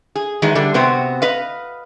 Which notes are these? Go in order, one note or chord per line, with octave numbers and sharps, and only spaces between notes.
G#4
D#3 E3 F#3 G#3
D3 G3 D4
C3 B3 C4 F#4
B4 D#5 F5